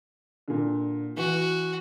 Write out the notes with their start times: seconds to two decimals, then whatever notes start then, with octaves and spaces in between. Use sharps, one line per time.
0.48 A#2 D3
1.17 E3 F#4